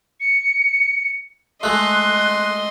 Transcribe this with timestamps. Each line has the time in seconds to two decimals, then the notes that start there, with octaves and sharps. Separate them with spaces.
0.20 C#7
1.63 G#3 A3 D#5 C6 F#6